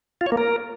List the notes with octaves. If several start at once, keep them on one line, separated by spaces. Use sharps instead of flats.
F4
C#5
A#3
A#4